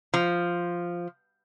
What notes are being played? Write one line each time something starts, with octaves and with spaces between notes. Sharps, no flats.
F3